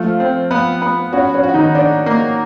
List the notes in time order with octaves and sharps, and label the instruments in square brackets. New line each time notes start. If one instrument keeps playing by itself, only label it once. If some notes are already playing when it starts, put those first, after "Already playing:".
Already playing: [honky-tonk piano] F3 F4 [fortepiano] A3
[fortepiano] C4
B3
B3
[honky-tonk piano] C#4 [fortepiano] F#4
[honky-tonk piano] C#4
[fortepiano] F#4
[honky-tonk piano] D#3 D#4
[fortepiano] D4
A#3